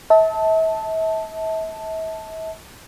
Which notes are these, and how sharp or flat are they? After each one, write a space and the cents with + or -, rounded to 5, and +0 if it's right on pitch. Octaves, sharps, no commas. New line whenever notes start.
E5 -40 A5 +0